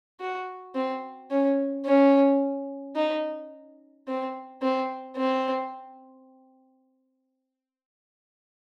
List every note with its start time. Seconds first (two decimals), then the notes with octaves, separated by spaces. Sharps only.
0.20 F#4
0.75 C4
1.31 C#4
1.86 C#4
2.96 D#4
4.08 C4
4.62 C4
5.17 C4